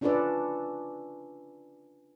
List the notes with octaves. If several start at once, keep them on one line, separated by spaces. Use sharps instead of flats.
C#4 D4 F4 A4 B4 D5